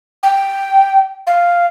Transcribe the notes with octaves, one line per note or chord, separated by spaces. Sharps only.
G5
F5